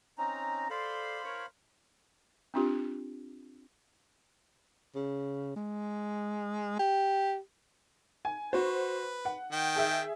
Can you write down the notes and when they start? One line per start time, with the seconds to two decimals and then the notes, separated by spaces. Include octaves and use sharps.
0.18 C4 C#4 D#4 A#5
0.70 A4 C5 D5 F5 B5 C6
1.24 E4 A#4 C#5
2.54 C4 D4 F4 G4
4.95 C#3
5.56 G#3
6.79 G4
8.25 G#5
8.53 F#4 B4 C5
9.25 F#5
9.52 D#3 G5
9.76 G#4 E5